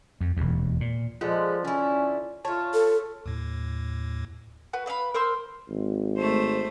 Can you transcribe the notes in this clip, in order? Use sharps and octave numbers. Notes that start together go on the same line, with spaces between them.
F2
E1 D#2
A#2
F3 G#3 B3 F4 A4 D5 F#5
D3 C#4 E4
A3 F4 C#5 A5
A4
D#2 A2
F#4 B4
B4 E5 F5 B5
A#4 C5 C6 E6
G#1
A3 C5